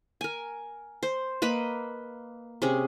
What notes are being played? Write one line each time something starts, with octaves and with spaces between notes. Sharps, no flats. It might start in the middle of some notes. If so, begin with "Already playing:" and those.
A#4 G#5
C5
A#3 B4 D#5 B5
C3 C#4 G#4